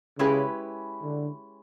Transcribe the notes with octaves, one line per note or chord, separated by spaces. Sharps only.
C#3 G#3 C#4 E4 G4 B4
D3